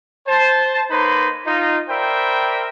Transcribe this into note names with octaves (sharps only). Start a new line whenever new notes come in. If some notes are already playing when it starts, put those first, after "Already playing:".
C5 A5
A#3 D#4 B4 C#5 B5 C6
D#4 F4
A#4 C5 D5 E5 G5 B5